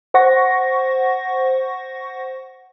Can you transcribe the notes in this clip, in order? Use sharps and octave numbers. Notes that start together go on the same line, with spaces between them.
C5 F#5 C#6 A#6